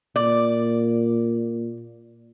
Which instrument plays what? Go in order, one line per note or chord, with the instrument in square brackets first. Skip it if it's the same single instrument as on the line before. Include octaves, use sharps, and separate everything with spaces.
[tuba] A#2 [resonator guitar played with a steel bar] D5